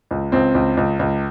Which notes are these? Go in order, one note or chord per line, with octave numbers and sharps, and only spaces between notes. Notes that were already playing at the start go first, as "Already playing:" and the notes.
C#2
C#2 C4
C#2
C#2
C#2